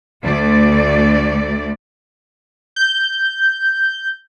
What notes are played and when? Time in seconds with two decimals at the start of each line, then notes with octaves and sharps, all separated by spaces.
0.24 D2 A3 D5
2.76 G6